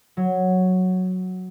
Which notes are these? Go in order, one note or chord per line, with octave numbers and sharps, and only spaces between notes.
F#3